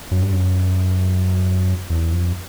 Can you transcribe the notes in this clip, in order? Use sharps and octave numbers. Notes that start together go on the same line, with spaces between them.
F#2
G2
F#2
E2
F2